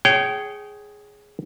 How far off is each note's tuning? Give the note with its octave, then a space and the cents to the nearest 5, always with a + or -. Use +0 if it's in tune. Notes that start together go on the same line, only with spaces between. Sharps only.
G#4 +0 C#5 +0 G5 -30